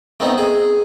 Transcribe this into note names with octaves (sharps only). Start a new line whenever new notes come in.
A3 B3 C4 D#4
G#4